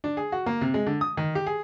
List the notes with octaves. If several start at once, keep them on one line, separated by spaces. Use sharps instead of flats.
D4
G#4
F#4
A#3
C3
G#3
D3
D#6
D#3
G4
G#4